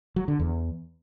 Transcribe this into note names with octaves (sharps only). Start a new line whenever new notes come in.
F#3
D3
E2